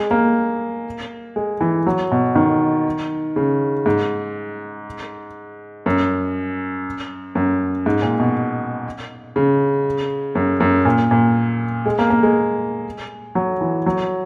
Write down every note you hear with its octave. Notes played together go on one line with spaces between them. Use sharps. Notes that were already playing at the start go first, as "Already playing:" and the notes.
Already playing: G#3
A#3
G#3
E3
F#3
B2
D#3
C#3
G#2
F#2
F#2
G#2
A#2
B2
C#3
F#2
F#2
A#2
A#2
G#3
A#3
A#3
G#3
F#3
E3
F#3